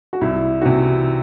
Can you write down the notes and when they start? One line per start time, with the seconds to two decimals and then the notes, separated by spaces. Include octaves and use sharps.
0.13 F#4
0.21 C2 E4
0.61 C3 E3 F#4